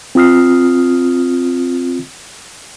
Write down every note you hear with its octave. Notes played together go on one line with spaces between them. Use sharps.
C4 F4 D#6 F6 C7